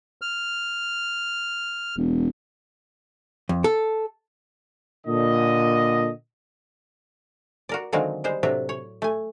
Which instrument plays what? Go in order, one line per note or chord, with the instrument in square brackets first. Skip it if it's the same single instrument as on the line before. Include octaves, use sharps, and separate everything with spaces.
[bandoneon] F6
[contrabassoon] E1
[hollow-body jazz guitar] F2
A4
[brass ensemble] A#2 D3 D#5
[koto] F#4 A#4 D5
D3 D#3 F#3 G#3 A#3 C4
G3 G#3 C5
A2 C3 F#3 D4 E5
C#5
A3 G#5